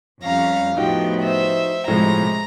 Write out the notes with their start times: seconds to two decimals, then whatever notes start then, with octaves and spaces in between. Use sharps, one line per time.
0.23 F2 G3 C#4 F5 A#5
0.77 A2 F3 B3 D#4 F#4 G4 G5
1.21 C5 E5
1.88 A2 C3 F3 G#3 A#5